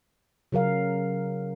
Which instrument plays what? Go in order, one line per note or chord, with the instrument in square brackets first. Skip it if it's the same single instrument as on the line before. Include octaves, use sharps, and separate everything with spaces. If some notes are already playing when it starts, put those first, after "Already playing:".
[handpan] C#3 F#3 A#4 F5